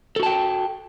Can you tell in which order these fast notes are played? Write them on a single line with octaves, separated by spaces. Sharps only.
A4 F#4 A5 G5